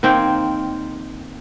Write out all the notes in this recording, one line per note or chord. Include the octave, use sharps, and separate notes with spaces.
D#3 A#3 C4 C#5